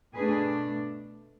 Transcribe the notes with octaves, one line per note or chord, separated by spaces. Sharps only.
B2 A3 D4 G#4 B4